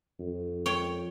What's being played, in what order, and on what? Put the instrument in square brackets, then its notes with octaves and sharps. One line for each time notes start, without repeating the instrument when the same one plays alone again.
[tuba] F2
[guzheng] C#5 G5